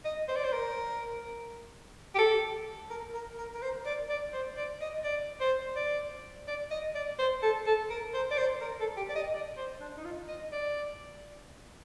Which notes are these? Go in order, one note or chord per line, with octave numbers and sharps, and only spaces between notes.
D#5
C5
D5
C5
A#4
G4
A4
A#4
A#4
A#4
A#4
C5
D5
D5
C5
D5
D#5
D5
C5
D5
D5
D#5
D5
C5
A4
A4
A#4
C5
D5
C5
A#4
A4
G4
D5
D#5
D5
C5
D4
D#4
F4
D#5
D5